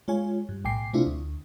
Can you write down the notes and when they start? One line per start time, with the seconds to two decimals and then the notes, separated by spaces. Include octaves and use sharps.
0.08 G#3 F4 C#5 G#5
0.49 G2
0.64 B1 A2 G5 G#5 D6 C7
0.93 C3 A3 C4 D4 E4 F4
1.07 D2